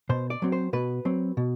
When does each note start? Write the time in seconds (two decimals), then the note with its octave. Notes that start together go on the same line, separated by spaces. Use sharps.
0.09 B2 C5
0.30 D5
0.42 F#3 C4
0.52 C5
0.73 B2 B4
1.05 F#3 C4
1.37 B2